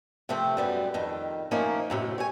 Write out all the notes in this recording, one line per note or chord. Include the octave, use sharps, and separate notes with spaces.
C3 F3 A3 C4
F#2 G3 B3
F2 D#3
F3 A3 A#3 C#4 D#4
F#2 A2 C3
C#5 G#5